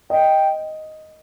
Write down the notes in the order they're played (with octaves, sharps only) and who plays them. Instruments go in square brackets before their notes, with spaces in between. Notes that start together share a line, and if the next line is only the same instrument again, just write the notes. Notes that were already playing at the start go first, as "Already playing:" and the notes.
[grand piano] D#5 [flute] G5